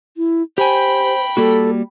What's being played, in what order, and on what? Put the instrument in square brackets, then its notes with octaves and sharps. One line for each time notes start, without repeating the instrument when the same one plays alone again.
[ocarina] E4
[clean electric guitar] G4 G#5 [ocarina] C5 [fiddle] G5 B5
[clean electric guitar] G3 A#3 F#4 [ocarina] A4